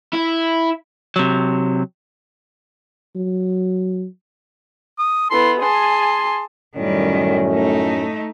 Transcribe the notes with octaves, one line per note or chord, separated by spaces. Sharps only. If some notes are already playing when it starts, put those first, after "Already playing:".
E4
C3 F#3
F#3
D#6
B3 E4 A4 C6
G#4 G#5 A5 C6
F#2 A2 D#3 G3 C#4
A3 D#4